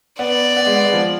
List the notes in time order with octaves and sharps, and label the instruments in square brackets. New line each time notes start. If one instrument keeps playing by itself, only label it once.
[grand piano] B3 [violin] D5
[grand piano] B3
G#3
B3
G#3
F3